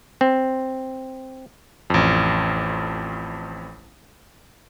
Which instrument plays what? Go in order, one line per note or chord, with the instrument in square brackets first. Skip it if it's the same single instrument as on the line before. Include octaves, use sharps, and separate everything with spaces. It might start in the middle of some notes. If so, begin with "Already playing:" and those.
[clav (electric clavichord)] C4
[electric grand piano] A1 F2